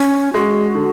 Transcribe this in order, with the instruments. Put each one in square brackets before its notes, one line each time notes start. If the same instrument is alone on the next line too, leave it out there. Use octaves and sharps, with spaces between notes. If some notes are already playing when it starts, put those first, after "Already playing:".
Already playing: [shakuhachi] C#4
[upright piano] G#3 [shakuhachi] F#4
[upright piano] D3